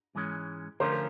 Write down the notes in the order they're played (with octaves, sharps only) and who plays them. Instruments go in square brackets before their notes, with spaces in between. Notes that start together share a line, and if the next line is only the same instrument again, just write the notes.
[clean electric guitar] G#2 E3 G#3 C#4
[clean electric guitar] D3 F3 A3 C#4 F4 [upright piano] A#4 C5
[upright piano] A#4